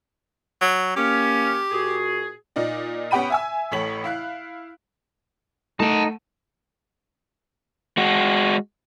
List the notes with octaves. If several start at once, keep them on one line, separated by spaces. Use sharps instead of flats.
F#3
A#3 C#4 G4
A#2 F#4 G#4
A#2 D#4 D5
B3 C#4 G4 G5 B5 D#7
E5 G#5 E6
A1 A2 A3 C#5 B6 F#7
E4 F5 F#6
A3 D#4 F#5 A5
G#3 F#4